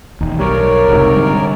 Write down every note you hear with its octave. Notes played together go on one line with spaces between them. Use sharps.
E1 D#2 D#3
B1 G3 A#4 C#5 D5
F#1 C2 G#2 C3
D3 G3